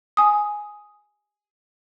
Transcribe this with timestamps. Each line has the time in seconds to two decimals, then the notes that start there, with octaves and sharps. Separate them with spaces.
0.17 G#5 D#6